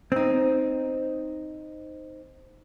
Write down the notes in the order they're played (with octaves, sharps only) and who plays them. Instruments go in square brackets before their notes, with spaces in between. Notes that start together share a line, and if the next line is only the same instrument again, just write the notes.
[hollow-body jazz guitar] C4 D#4